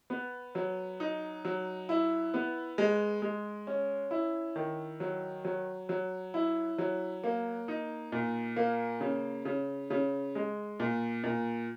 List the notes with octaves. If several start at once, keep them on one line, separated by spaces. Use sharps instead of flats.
B3
F#3
D#4
F#3
E4
B3
G#3
G#3
C#4
E4
D#3
F#3
F#3
F#3
E4
F#3
A#3
D#4
A#2
A#3
C#3
C#3
C#3
G#3
A#2
A#2